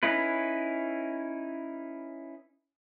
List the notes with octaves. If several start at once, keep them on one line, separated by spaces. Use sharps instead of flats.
C#4 D#4 E4 B4